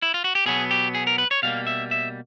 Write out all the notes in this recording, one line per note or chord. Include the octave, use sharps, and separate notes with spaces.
E4
F4
F#4
G4
B2 F#3 B3 G#4
G4
G#4
A#4
B4
C#5
B2 G3 A#3 F5
E5
E5